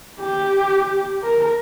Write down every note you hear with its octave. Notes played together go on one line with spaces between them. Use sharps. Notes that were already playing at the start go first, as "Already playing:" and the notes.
G4
A#4